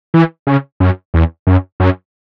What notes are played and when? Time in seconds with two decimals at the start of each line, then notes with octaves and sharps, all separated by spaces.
0.14 E3
0.47 C#3
0.80 F#2
1.14 E2
1.47 F#2
1.80 F#2